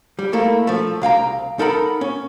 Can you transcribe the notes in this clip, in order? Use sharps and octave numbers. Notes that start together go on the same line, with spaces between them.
G3
A3 A#3 E4
F3 A3
C2 F5 G5 A#5
D#4 A4 A#4 F#5 A#5 B5
C#4